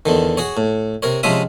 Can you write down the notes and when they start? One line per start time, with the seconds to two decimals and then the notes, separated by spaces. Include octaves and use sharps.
0.06 E2 D3 D#3
0.37 F#4 G#4 C#5
0.57 A2
1.03 C3 A#4 C#5
1.23 C3 F3 G#3 C#4 E5 D#6